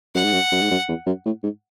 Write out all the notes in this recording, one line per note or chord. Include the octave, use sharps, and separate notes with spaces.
F#2 F#5
G#2
F#2
F#2
G#2
F#2
E2
F#2
A2
G#2